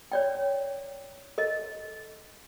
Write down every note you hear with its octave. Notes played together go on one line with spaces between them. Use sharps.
C#5 D5 G5
A4 A#4 D#5